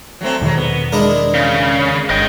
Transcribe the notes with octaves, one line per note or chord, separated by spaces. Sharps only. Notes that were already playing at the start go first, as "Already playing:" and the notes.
F#3 A3 C4
E2 G#2 B2 D#3 F#3
B3
G#3 D4 E4 A#4
C#3
G1 D#5 G5